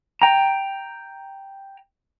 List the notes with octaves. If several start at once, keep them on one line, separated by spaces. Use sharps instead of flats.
G5 A#5